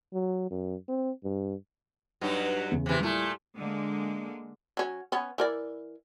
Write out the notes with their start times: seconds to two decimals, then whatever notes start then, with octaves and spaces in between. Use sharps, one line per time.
0.14 F#3
0.51 F#2
0.89 C4
1.24 G2
2.21 G2 F#3 D#4
2.71 E2 C#3
2.86 C3 E3
3.00 A#2 G3 A3 E4
3.57 D3 G#3 A#3
4.77 F#3 C#4
5.12 B3 C#4
5.38 E3 A#4 D5